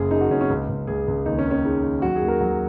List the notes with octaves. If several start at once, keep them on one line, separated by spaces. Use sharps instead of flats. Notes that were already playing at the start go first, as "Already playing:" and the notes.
Already playing: F#1 F#2 G#4
C#3 D#4
F#4
F#1 C#4
C#4
C#2
C#2
C#2 G#4
C#2
D#2 D#4
C#4
D#3
C#4
G#3 D#4
D#3
F#3 F#4
G#4
D#2
A#4
F#3